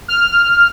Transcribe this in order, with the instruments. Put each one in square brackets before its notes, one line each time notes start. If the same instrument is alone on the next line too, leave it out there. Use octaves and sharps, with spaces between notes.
[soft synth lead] F6